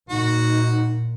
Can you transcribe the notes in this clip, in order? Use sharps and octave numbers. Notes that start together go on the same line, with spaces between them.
A#2 D#4 F#4